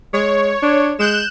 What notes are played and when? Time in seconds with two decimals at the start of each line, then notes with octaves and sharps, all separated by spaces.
0.13 G#3 C#5
0.62 D4
0.99 G#3 F#6 G6 E7